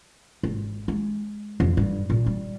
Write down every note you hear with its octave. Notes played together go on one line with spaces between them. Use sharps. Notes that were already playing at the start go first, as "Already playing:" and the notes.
G#1
G#3
F2
G2
A#2
G3